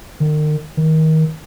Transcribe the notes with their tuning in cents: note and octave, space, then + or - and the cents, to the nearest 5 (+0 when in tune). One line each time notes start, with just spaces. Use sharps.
D#3 -40
D#3 +25